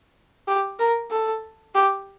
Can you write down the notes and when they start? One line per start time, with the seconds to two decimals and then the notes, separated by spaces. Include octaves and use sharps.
0.48 G4
0.80 A#4
1.11 A4
1.75 G4